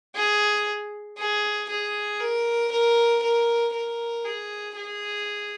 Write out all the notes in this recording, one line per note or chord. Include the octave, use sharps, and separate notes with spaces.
G#4
G#4
G#4
A#4
A#4
A#4
A#4
G#4
G#4